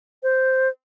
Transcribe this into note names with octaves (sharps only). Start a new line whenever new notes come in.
C5